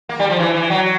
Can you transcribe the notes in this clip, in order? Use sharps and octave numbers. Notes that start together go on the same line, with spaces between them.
A#3
G3
F3
E3
E3
F#3